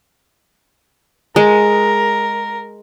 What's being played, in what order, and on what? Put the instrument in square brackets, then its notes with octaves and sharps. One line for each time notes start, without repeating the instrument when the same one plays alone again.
[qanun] G#3 [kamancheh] A#4